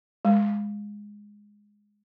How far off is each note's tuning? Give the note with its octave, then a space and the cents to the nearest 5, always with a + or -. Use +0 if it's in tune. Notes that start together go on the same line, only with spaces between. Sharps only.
G#3 -5